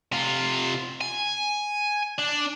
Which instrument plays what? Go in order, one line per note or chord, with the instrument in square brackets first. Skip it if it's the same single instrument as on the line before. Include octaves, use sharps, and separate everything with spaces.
[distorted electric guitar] C3 F4
G#5
D4